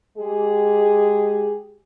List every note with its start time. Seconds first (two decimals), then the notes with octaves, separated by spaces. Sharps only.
0.17 G#3 G4 G#4